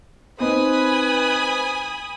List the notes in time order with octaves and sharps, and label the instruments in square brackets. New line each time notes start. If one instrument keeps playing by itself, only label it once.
[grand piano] C4 D#4 [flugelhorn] B4 [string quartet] G#5 B5 D#6